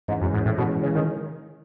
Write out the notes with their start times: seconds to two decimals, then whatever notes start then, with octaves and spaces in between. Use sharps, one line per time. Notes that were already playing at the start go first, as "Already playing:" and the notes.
0.08 G#2 E3 G#3 C#4
0.21 F#2
0.33 G#2
0.46 A2
0.57 B2 E3 G#3 C#4
0.83 C#3
0.95 D#3